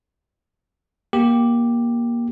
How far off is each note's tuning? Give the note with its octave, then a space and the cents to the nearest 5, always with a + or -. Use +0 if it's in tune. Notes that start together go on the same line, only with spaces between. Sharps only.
A#3 +20 G4 +0